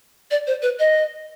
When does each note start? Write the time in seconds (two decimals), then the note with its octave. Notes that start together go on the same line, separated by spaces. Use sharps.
0.31 D5
0.47 C5
0.62 B4
0.79 D#5